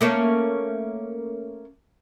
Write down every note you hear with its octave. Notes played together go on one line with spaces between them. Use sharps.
A3 A#3 C#4